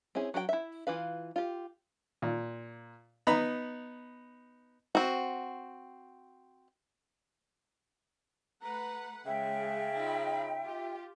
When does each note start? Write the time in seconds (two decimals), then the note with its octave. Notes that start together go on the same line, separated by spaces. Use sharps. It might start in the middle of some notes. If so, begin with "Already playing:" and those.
0.15 C4 C#4 E4 G#4
0.34 F#3 F#4 G#4 G5
0.49 E4 E5
0.87 E3 F4 B4 F5
1.36 F4 G4
2.22 A#2
3.27 B3 D#4 A#5 B5
4.95 C4 F#4
8.62 A3 B4 F#5 A#5
9.26 C#3 G#3 E5 G5
9.95 D#4 F4 B5
10.61 F4 G4